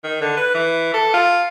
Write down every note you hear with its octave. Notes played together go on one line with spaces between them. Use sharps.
D#3
D3
B4
E3
A4
F4